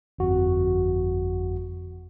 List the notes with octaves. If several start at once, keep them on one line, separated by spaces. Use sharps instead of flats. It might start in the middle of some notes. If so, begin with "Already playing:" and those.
G1 F2 F#4